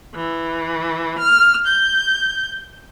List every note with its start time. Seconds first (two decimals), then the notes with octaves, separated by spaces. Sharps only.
0.14 E3
1.18 F6
1.65 G6